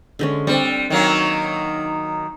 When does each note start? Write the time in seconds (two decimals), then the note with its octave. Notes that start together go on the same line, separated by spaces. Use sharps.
0.19 D3 G#3 C#4
0.47 G3 C4 D4
0.90 D#3 F#3 A#3